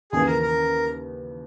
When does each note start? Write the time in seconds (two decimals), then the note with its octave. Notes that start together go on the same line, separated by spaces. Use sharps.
0.12 D#2 C#3 E3 G#4
0.27 A#4
0.43 A#4